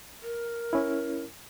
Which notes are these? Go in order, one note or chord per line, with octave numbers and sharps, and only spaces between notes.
A#4
C#4 E4